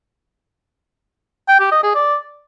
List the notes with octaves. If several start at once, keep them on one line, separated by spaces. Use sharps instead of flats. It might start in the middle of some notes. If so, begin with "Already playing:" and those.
G5
G4
D#5
G#4
D5